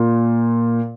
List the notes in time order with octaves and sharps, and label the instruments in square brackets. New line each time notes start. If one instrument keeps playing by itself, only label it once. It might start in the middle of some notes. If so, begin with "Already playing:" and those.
Already playing: [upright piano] A#2